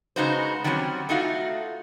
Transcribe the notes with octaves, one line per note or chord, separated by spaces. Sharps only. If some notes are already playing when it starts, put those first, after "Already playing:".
C#3 G#3 D#4 F#4 B4 C5
D#3 F#3 G3 C4 C#4
A3 D#4 F4 F#4